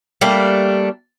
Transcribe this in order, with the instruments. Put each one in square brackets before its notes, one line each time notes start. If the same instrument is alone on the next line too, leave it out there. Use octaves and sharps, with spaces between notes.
[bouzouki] G3 A3 A#3 D4